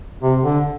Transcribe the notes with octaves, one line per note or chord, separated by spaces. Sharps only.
C3
D3